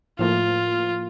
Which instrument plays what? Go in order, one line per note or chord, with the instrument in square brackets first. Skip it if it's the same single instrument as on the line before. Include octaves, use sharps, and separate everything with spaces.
[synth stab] A2 F3 A#3 [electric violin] F4